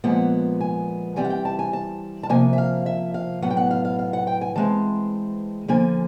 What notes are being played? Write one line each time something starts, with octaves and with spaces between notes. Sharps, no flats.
A#2 F3 G#3 B3 F#5
G#5
E3 G3 C4 G#5
F#5
G5
A5
G#5
A5
A5
C3 F3 A#3 G#5
E5
F5
E5
F5
A2 F#3 B3 F#5
G5
F#5
F5
F5
F5
F#5
G5
G#5
E3 G#3 C4 A5
D3 F3 A#3 G#5